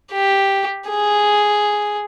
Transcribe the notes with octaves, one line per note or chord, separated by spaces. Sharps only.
G4
G#4